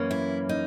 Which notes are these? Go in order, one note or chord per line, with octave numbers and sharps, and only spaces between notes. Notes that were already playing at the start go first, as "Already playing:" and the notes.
Already playing: F#2 E3 A#3 C#4
E4
D#4